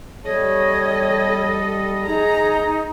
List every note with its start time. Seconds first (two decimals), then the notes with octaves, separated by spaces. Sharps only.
0.25 G3 A4 C#5 D#5
2.06 D#4 G#4 A#5